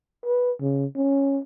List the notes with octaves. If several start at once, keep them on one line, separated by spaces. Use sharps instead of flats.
B4
C#3
C#4